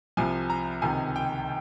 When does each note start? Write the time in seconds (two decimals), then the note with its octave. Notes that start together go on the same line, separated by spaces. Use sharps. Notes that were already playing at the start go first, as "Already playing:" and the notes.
0.17 C2 C3 F3 G#5
0.50 A#5
0.82 C#2 C3 D#3 G#5
1.16 G5